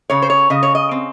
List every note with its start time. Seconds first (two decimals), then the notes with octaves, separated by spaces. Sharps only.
0.10 C#3 C#5
0.22 C5
0.30 C#5
0.50 C#3 D#5
0.63 C#5
0.75 D#5
0.91 C4